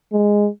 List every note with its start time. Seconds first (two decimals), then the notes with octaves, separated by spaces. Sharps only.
0.12 G#3